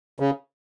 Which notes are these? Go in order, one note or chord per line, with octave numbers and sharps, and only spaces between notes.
C#3